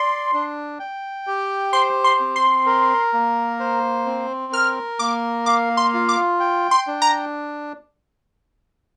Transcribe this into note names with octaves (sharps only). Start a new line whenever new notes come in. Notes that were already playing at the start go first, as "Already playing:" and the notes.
Already playing: D5 C6
D4
G5
G4
C5 C6
C6
C4
C6
A#4
A#3
C5
C4
A#4 F6
A#3 D6
F5 D6
C6
F4
D6
G5
C6
D4
A#5